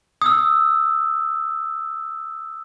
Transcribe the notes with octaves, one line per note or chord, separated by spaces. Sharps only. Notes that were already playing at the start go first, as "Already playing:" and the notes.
D#6 E6